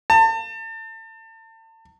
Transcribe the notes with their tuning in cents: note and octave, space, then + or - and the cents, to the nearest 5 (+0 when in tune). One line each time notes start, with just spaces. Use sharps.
A5 +35